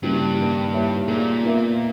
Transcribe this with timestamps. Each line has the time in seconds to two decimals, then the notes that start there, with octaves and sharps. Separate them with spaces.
0.03 G2 C#3 G3 A#3 E4 G4
0.37 D#3 A#3 D#4
0.72 A#3 E4 G4 C#5 E5
1.08 A#2 G#3 D#4 A#4
1.43 B3 D#4 A#4 E5